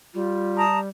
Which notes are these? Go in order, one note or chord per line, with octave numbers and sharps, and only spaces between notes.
G3 F4
A5 A#5 D#6